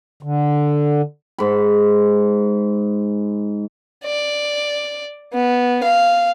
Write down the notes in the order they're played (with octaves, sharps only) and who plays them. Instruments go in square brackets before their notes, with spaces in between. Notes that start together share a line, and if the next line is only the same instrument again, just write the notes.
[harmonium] D3
[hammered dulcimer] G#2 B5
[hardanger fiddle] D5
B3
F5